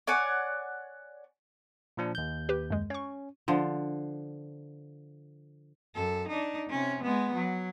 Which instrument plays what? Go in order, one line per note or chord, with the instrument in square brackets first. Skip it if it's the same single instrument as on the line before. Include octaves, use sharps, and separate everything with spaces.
[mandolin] C#5 D5 F#5 G#5
[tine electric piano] A#2 F3 D4
D#2 G6
[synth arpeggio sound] G4 B4
F#2 G#3
[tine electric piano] C#4 [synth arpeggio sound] C#5 C#6
[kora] D3 F3
[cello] F#2 A4
D4 D#4
C3 C#4
G#3 B3
F#3